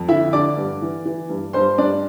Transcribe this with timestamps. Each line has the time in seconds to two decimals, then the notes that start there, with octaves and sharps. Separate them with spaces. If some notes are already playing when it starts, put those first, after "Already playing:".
Already playing: F2
0.08 D3 E4 E5
0.33 D3 D5 D6
0.57 G2
0.82 E3
1.06 E3
1.29 G2
1.53 G2 C5 C6
1.78 G2 D4 D5